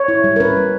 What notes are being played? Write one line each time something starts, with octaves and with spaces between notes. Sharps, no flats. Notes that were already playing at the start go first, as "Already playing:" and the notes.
Already playing: C#5
E4
G3
A#4
C#4 B4
G3